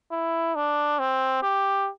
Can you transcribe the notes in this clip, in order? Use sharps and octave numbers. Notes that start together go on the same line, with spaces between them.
E4
D4
C4
G4